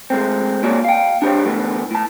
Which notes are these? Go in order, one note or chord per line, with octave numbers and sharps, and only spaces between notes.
G#3 A3 C4
A#3 F#4 C#5 D5
F5 G5
D4 G4 C5 C#5
D2 E3 A3 B3
A2 A5